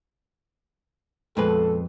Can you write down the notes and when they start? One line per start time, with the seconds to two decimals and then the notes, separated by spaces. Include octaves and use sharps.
1.37 F2 A#2 G#3 B3 G#4 A4 B4